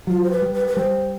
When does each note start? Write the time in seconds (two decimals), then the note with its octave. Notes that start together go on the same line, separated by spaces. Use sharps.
0.07 F#3 F4
0.23 C5
0.31 B4
0.42 G3
0.54 B4
0.67 B4
0.77 G3 C5